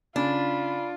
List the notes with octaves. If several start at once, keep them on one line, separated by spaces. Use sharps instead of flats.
C#3 C#4 D4 F4 B5